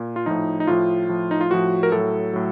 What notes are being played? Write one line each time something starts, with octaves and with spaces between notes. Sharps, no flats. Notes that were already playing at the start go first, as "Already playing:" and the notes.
Already playing: A#2
F4
A2 F3 D#4
D#4
A2 F3 F4
A2 F3
D#4
F4
A2 F3 F#4
A#4
A2 F#3 A4
A2 F#3